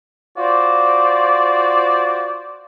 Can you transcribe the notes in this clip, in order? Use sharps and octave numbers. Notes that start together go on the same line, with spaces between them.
F4 F#4 C5 D5